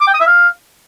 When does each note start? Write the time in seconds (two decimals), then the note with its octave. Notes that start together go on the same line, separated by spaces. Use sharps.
0.01 D6
0.07 G5
0.14 D#6
0.20 E5
0.27 F5